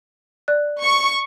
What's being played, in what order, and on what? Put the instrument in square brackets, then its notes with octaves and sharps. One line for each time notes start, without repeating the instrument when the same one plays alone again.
[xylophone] D5 F#6
[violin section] C#6